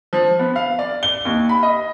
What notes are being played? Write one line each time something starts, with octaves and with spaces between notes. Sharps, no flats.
F3
B3
F5
D5
G7
D#2
B5
D#5